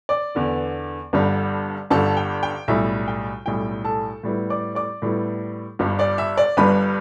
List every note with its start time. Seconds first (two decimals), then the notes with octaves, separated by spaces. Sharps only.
0.09 D5 D6
0.35 E2 D3 B3
1.13 G1 G2 D3 G3
1.90 G1 G2 D3 G3 A4 A5
2.17 G5
2.43 G5
2.68 B1 A2 G3 E4 E5
3.08 G5
3.46 B1 A2 G3 E4 G5
3.85 A4 A5
4.23 A2 G3 B3 E4
4.50 D5 D6
4.75 D5 D6
5.02 A2 G3 B3 E4
5.79 G1 G2 G3
5.99 D5 D6
6.18 E5 E6
6.37 D5 D6
6.57 G1 G2 G3 B4 B5